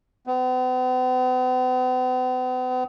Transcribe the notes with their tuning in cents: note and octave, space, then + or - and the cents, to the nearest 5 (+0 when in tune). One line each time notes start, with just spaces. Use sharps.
B3 +45